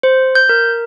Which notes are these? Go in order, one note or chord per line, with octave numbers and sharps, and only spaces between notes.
C5
G6
A#4